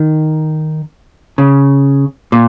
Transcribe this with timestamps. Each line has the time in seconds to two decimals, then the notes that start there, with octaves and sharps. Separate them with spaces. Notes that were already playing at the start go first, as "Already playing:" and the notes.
Already playing: D#3
1.38 C#3
2.32 A#2